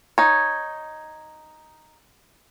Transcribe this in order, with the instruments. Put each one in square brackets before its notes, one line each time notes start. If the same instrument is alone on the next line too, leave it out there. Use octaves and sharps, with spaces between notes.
[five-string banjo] D#4 C#5